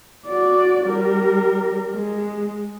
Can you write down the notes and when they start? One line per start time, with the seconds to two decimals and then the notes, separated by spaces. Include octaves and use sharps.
0.27 F#4 D5
0.85 G3 A#4
1.92 G#3